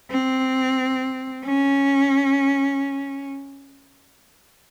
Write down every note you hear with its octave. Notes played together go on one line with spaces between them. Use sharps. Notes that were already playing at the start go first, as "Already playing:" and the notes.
C4
C#4